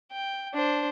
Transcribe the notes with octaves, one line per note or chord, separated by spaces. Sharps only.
G5
D4 C5